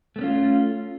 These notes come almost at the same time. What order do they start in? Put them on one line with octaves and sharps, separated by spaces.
A3 B3 C#4 F4